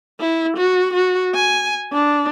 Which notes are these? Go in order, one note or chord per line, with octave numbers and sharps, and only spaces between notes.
E4
F#4
F#4
G#5
D4